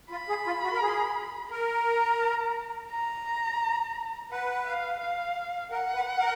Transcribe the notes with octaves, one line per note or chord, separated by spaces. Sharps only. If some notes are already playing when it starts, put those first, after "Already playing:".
F4 B5
G#4
F4
F#4
A#4
G#4
A#4 A#5
A#5
B4 F#5
F5
F5
A#4 F#5
B4
A#4